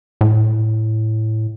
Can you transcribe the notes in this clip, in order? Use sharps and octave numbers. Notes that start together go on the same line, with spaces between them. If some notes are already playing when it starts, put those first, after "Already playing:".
A2